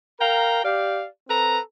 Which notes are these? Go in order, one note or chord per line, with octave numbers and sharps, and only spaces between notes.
A#4 F5 G5 A#5
G4 D5 F5
C4 A4 B4 A#5